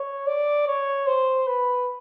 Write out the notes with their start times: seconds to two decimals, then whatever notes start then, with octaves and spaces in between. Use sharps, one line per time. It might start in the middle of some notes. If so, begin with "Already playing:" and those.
Already playing: C#5
0.27 D5
0.67 C#5
1.07 C5
1.47 B4